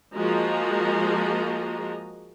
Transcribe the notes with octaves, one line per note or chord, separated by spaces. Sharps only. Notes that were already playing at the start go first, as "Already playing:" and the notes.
F3 G#3 A#3 F#4 D#5 A#5